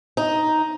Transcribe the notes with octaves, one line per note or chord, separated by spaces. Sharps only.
D#4